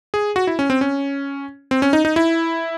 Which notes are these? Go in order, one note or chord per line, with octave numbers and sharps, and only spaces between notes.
G#4
F#4
E4
C#4
C4
C#4
C4
C#4
D#4
D#4
E4